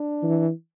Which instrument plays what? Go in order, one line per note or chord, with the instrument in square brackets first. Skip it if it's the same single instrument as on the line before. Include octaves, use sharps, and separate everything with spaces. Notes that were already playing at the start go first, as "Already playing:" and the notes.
Already playing: [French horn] D4
[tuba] E3